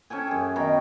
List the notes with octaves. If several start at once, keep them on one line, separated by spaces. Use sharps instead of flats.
C#4 A4 G5 G#5
F#2 G#4
B2 D#3 G5